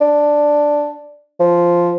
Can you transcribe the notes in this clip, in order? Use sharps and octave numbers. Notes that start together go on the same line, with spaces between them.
D4
F3